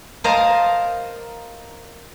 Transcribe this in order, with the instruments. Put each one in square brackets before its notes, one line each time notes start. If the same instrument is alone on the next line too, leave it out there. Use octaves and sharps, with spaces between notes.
[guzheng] A#4 C5 D#5 F5 A5 A#5